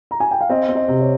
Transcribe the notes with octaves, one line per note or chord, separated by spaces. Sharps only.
A#5
G#5
G5
F5
C4 D#5
C4
D#5
C3
C#5